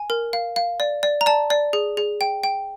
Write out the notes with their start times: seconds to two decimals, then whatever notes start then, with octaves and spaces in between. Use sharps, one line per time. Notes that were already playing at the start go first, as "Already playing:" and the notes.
Already playing: G#5
0.10 A#4
0.33 F5
0.56 F5
0.80 D5
1.03 D5
1.21 A#5
1.26 D5 A5
1.50 D5
1.73 G#4
1.97 G#4
2.21 G5
2.44 G5